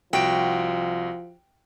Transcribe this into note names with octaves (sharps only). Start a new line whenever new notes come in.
C2 F3 F#4 G5 D7